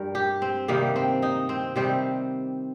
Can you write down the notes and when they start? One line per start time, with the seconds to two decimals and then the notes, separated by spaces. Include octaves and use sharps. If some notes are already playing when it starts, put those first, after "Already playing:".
Already playing: G2 G3 A#4
0.15 G4
0.42 C4
0.68 C3 D#3 G3 A#3
0.96 C4
1.22 D#4
1.49 C4
1.76 C3 D#3 G3 C4